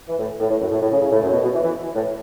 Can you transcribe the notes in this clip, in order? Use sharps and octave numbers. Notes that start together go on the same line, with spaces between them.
E3
A2
A2
A2
F#2
A2
A2
C#3
C#3
A2
F#2
B2
B2
E3
E3
A2